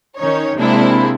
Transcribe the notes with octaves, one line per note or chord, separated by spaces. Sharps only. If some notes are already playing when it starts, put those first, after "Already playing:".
D#3 C#4 D#4 C#5
C3 G#3 A#3 C4 D4 E4